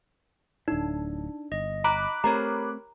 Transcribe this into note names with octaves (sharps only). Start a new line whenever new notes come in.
D1 A2 D4 D#4
G1 D#5
A#5 B5 D6 F#6
A3 C4 G4 A#4 C#5 A#5